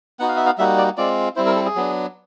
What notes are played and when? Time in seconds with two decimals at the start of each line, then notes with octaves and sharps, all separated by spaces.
0.20 B3 D#4 F#4 F#5
0.28 F5
0.37 E5
0.46 F5
0.58 G3 A#3 D#4 F#4 E5
0.78 D5
0.98 G#3 C4 F4 D5
1.36 G3 C4 E4 C5
1.46 A#4
1.55 A4
1.65 G#4
1.75 F#3 B3 D4